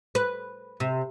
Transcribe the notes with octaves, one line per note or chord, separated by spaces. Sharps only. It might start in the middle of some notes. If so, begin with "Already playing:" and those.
B4
C3